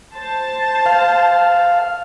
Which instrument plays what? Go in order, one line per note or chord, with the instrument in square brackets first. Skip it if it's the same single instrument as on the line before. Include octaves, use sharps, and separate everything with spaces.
[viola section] C5 A5
[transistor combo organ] F5